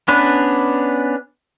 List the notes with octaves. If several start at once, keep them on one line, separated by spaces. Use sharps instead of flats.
B3 C#4 D4 B4